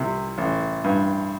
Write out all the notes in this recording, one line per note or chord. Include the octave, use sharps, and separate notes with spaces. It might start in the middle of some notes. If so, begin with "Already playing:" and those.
Already playing: C2 C3
A1
G2